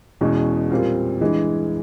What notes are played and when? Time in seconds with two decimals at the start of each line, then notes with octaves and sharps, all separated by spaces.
0.21 E2 B2 G#3 C#4
0.71 A#2 G3 C4 F4
1.21 G2 E3 G#3